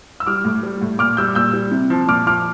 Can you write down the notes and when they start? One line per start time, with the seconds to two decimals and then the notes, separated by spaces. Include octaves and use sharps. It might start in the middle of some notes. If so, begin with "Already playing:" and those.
0.20 E6
0.26 G3 D6 F6
0.45 A2
0.63 G3
0.81 A2
0.99 A#2 D6 F6
1.17 G3 E6 G6
1.35 A#2 E6 G6
1.53 G3
1.71 C3
1.90 F3
2.08 A#2 D6 F6
2.26 F3 D6 F6